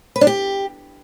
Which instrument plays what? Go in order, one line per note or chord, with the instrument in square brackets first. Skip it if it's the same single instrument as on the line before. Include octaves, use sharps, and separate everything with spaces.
[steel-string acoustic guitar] B4
D4
G4